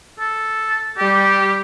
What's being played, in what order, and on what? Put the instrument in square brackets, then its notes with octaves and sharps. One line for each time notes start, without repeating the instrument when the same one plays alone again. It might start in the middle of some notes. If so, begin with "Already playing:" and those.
[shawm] A4
[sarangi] G3 [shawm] G4